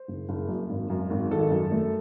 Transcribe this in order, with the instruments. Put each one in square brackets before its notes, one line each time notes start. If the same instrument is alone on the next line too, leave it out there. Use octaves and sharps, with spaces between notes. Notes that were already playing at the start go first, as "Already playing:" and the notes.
Already playing: [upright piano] C5
F#1
F#1
F#2
G#1
F#2
G#1
D#3 A4
F#2
A3